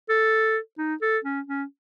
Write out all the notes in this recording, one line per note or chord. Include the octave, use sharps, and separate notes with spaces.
A4
D#4
A4
C#4
C#4